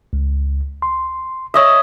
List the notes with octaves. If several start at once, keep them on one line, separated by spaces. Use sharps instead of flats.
C#2
C6
C#5 D#5 E5